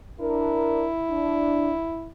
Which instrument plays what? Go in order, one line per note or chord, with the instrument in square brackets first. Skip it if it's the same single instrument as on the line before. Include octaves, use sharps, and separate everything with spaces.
[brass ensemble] D4 A#4 [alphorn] E4
[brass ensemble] D4